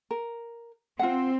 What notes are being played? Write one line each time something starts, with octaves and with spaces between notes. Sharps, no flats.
A#4
C4 F4 F#5